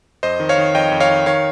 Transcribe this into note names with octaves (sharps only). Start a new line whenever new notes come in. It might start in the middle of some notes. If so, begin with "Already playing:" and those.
F2 C5 D#5
D#3
C#5 F5
D#3
F2 D#5 G5
F2
C#5 F5
D#3
D#3 C#5 F5